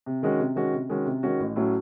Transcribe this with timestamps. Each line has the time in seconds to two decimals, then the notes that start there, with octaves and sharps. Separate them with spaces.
0.06 C3
0.23 D#3 G#3 C#4 F#4
0.39 C3
0.56 D#3 G#3 C#4 F#4
0.73 C3
0.89 D#3 G#3 C#4 F#4
1.06 C3
1.23 D#3 G#3 C#4 F#4
1.40 A1
1.56 A2 F#3 A3 C#4